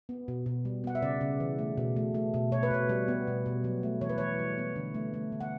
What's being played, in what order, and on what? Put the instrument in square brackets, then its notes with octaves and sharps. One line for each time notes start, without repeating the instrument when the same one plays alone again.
[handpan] B3
B2
B2
G3
B3 F#5
E5
C#3 D5
C#3
E3
A3
B2
A3
A3
B2
B2 C#5
B4
B2 C#5
G3
B3
B2
B2
F#3
A3
E3 C#5
B4
E3 C#5
G3
B3
D3
A3
A3
D3
F#5